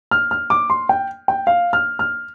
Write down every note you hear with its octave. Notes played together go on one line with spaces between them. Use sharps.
F6
F6
D6
C6
G5
G5
F5
F6
F6